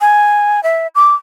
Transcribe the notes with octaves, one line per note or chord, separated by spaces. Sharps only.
G#5
E5
D6